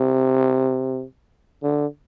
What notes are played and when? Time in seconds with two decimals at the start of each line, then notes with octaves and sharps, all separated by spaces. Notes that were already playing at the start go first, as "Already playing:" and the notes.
Already playing: C3
1.63 D3